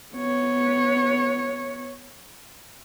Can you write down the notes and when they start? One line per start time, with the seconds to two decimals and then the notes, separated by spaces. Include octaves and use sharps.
0.15 B3 C#5